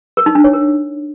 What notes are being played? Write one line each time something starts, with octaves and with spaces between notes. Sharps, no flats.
A#4
D#4
D4
C#5
A#4